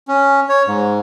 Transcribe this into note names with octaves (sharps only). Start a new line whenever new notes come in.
C#4
C#5
G#2